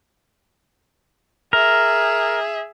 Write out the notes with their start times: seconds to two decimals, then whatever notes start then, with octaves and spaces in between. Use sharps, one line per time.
1.53 G#4 A#4 E5